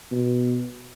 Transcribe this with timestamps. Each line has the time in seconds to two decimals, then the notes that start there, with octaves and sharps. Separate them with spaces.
0.12 B2